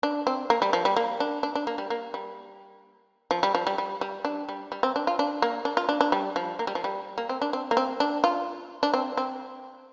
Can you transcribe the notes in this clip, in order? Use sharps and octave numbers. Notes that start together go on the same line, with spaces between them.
D4
C4
A#3
G3
F3
G3
A#3
D4
D4
D4
A#3
G3
A#3
G3
F3
G3
F3
G3
G3
G3
D4
G3
G3
C4
D4
F4
D4
A#3
D4
F4
D4
D4
G3
F3
A#3
G3
F3
G3
A#3
C4
D4
C4
A#3
C4
D4
F4
D4
C4
C4